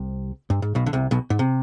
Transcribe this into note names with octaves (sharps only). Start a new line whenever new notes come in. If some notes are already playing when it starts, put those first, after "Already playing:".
Already playing: C2 C3
G2
G#2
B1 B2
D3
C2 C3
B1 B2
G#2
C3